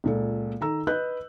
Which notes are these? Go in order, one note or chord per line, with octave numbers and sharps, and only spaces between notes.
C#2 A#2 A4
D#3 A4 A#5 E6
B4 D#5 F#6 G6